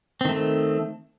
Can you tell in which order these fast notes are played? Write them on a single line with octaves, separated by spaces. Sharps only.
C4 D#3 A3